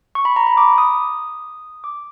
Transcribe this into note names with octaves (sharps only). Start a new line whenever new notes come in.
C#6
B5
A#5
B5
D6
D#6
D6